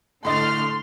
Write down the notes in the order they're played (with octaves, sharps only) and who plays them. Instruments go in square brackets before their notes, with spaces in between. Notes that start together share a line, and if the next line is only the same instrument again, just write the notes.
[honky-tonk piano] A2 D#5 A6 [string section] D3 A3 F6 [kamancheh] C6